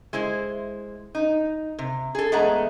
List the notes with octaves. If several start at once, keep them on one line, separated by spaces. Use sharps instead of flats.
G#3 E4 C5
D#4
C3
G#4 A4
E2 G#3 A3 B3 F#5 A#5